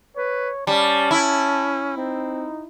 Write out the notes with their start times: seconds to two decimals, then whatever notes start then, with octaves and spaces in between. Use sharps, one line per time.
0.17 B4 C#5
0.67 G3 C#4 A5
1.11 E4
1.97 C4 D#4